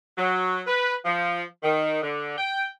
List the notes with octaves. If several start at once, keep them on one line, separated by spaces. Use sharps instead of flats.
F#3
B4
F3
D#3
D3
G5